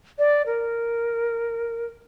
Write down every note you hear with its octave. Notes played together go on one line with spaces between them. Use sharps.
D5
A#4